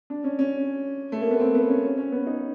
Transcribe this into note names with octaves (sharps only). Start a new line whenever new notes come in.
D4
C#4
C#4
A3
A#3
B3
C4
B3
C#4
C#4
C#4
B3
D#4